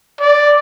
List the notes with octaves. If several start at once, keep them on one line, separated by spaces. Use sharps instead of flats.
D5